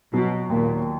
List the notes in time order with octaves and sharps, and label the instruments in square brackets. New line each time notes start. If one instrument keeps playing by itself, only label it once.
[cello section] B2 [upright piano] F#3
[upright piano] D#2 [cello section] A#2